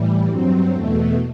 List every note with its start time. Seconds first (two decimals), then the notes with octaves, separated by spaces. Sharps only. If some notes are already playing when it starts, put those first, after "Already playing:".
Already playing: A2 E3 G3
0.27 G2 F#3 C4
0.71 E2 B2 A3